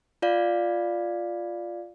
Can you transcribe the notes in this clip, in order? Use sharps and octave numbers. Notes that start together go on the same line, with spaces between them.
F4 D5 F5